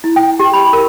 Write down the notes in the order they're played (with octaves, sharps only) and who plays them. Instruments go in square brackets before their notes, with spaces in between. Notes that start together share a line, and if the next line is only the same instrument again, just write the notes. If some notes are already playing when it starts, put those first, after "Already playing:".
[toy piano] E4
G5
G4
B5
A#4